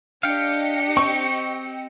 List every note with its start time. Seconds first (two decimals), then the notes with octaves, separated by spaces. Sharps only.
0.23 D4 G4 D#5 F5 G5 C#7
0.97 C4 G5 C#6